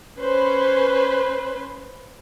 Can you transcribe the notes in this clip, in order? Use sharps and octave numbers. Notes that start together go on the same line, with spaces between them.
C#4 B4 C5